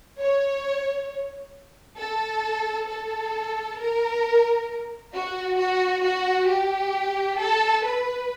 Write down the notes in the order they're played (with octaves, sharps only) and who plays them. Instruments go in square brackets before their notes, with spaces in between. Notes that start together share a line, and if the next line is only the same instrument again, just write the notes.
[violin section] C#5
A4
A4
A#4
F#4
F#4
F#4
G4
A4
B4